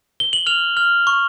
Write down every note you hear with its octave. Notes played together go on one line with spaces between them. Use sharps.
G7
F#7
F6 F7
F6
C#6